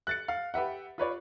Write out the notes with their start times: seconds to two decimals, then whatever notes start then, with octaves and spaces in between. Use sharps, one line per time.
0.07 F#6 A6 C#7
0.28 F5
0.54 G4 B4 E5 F#5
0.98 F4 B4 C#5 D5